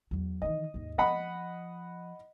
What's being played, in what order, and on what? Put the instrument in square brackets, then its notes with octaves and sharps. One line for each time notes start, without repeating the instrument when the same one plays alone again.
[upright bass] E2 F#3
[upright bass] D#3 E3 [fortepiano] D#5
[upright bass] D#2 G#2
[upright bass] F3 [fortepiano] D#5 F#5 B5